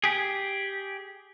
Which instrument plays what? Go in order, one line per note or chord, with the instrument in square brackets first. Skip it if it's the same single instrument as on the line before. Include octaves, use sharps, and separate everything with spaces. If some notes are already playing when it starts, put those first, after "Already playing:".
[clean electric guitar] G4 G#4